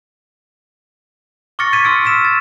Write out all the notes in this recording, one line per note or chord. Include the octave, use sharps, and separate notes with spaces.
C#6 D6 F6 A6 A#6 C#7
F6 G#6 A6 B6 C#7 D#7
C6 E6 F6 D7
E6 B6 E7
A6